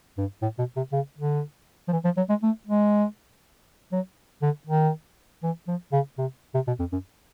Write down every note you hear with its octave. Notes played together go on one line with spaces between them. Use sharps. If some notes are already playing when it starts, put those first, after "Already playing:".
G2
A2
B2
C3
C#3
D3
F3
E3
F3
F#3
G#3
A3
G#3
F#3
D3
D#3
E3
F3
C#3
C3
C3
B2
F2
F#2